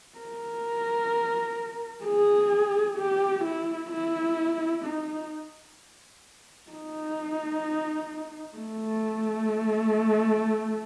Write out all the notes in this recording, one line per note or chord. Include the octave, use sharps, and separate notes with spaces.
A#4
G#4
G4
E4
E4
D#4
D#4
A3